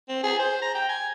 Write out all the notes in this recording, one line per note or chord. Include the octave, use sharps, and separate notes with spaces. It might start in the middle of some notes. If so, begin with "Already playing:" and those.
C4
G#4
C5
A#5
G5
G#5